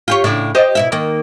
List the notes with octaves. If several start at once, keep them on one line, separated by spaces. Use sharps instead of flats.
F4 G4 C#5
A2 C#3 D4
G4 C5 D#5
B2 E4 E5
D#3 A#3